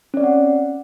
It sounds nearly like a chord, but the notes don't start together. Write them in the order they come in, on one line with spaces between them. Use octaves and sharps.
C#4 D5 C4 F#5